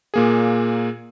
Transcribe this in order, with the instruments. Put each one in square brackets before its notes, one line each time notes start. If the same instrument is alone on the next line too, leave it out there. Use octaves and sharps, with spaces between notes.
[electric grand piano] A#2 A#3 G#4